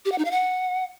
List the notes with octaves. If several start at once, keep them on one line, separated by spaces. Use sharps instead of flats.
G4
F#5
D#4
F5
F#5